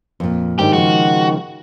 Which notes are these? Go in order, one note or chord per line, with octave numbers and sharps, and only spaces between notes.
F2 A#2
G#2 D#3 A3 D4 G4
C#3 F3 G#3 F#4